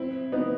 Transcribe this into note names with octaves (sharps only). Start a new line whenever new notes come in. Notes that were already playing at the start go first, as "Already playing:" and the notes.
Already playing: C4 E4
B3 D#4